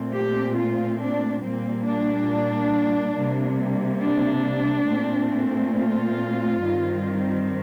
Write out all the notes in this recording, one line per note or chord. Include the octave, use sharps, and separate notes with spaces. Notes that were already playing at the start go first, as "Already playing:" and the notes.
Already playing: A#2 A3 C4
G4
F4
D4
A#2 G3 A#3 C4
D4
C3 G3 A#3
D4
A#2 A3 C4
F4
G2 D#3 G3 C4